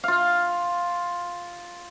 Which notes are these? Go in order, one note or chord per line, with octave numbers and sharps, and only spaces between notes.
F4 F5